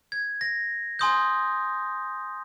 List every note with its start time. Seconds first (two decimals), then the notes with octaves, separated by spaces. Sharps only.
0.12 G#6
0.41 A#6
0.99 G#5 C6 D#6 G6